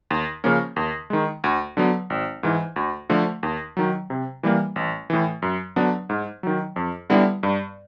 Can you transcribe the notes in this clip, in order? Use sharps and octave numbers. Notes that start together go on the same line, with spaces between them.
D#2
C#3 F3 A#3 C#4
D#2
D#3 G#3
D2
D3 F#3 B3
G#1
G#2 E3
D2
D3 F3 A3
D#2
D#3 F#3
C3
E3 G3 A#3
A1
A2 E3
F#2
D3 F#3 B3 D4
G#2
D#3 F#3
F2
D3 G3 B3 E4
G2